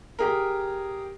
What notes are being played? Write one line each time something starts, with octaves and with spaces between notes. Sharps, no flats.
G4 G#4 A#4